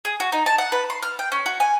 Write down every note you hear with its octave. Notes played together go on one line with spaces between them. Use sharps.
G#4
F#4
D#4
A5
F#5
B4
C6
F6
G5
C#4
F#4
G#5